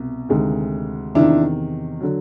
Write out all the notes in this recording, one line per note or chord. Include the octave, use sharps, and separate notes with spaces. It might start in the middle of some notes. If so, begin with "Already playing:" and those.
Already playing: C2 B2
D2 C3 D#3 G#3
E2 C3 D#3 D4 E4
D3 F#3